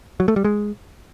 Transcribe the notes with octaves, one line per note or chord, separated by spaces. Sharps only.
F#3
A3
G3
G#3